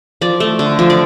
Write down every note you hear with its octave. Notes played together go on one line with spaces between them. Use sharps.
F3 D5
A3
D3
F3
D5